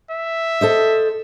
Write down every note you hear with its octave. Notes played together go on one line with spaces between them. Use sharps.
E5
A4 C5 D#5